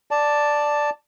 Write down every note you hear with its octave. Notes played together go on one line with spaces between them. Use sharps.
D5 A5